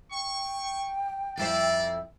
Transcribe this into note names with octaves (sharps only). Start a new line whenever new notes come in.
G5 C#6
F2 A#3 E4 C5 D5